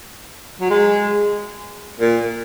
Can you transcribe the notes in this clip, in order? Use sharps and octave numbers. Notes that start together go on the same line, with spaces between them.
F#3
G#3
A#2